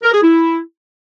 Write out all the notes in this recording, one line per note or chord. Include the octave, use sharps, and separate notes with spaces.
A#4
G#4
E4